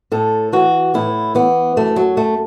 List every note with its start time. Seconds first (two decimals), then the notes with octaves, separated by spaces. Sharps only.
0.12 A2 A4
0.53 E3 F#4
0.94 A2 E4
1.35 E3 B3
1.77 F#2 A3
1.96 F#3
2.17 F#2 A3